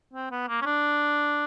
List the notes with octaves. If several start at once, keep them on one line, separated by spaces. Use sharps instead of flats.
C4
B3
A#3
C#4
D4